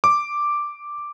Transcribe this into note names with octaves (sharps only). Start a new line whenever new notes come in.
D6